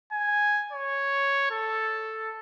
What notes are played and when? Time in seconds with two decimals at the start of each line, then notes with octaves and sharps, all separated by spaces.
0.12 G#5
0.72 C#5
1.51 A4